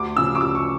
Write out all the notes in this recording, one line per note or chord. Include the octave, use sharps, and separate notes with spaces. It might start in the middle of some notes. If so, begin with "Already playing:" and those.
Already playing: D2 D6
C#3 F3 C#4 E6
D6
D2 E6
C#6